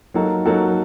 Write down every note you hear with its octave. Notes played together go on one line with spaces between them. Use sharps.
F#3 A#3 D#4 F#4 A4
F#3 A#3 D#4 F#4 A4